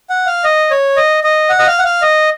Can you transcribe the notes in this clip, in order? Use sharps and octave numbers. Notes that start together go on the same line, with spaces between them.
F#5
F5
D#5
C#5
D#5
D#5
F#5
D#5
F5
F#5
F5
D#5